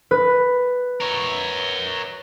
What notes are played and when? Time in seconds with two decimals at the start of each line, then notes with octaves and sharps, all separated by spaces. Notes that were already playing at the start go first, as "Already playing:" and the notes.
0.11 B4
1.01 A#4 C#5